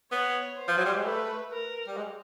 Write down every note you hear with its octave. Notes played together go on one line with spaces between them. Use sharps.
B3 C#5
C5
F3
F#3
G3
G#3
A3 B4
A#4
G3
G#3